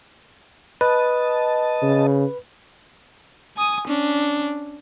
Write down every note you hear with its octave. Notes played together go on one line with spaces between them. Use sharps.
B4 D#5 A5
C#3
G#5 D#6
C#4 D4